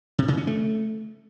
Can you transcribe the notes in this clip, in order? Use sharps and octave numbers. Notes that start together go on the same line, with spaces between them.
C3
C#3
C#4
A3